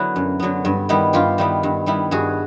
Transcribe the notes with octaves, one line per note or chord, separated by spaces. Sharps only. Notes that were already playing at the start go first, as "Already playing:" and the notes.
Already playing: D3 F#3 B3 E4 F#4
F#2
D3 F#3 B3
G2
D#3 G3 B3 E4
G2 F4 G4
D#3 G3 B3 E4
G2
D#3 G3 B3 E4
G2 F#4 G#4